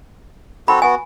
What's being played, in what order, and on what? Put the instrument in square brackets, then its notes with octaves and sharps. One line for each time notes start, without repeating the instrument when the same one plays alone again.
[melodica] C4 F#4 A4 [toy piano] B5
[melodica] B3 F#4 [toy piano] G#5